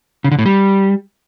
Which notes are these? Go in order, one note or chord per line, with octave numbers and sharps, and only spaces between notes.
C#3
D3
A2
G3